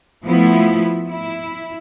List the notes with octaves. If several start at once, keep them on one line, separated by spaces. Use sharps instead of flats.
F3 A3 B3 E4
E4